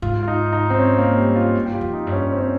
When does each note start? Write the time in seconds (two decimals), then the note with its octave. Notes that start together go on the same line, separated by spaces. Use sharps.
0.02 G#2 F4
0.23 F4
0.28 D#4
0.53 D#4
0.70 C4
0.79 C#4
0.98 A#3
1.17 G3
1.36 F4
1.55 G2
1.66 G4
1.74 F4
1.81 F2
1.93 D#4
2.07 G2
2.12 C#4
2.32 C4
2.41 C#4